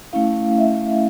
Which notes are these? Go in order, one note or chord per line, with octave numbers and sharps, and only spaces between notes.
A3 C#4 E4 F5
E5